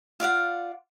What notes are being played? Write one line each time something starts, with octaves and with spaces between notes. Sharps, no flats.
F4 D5 F5 F#5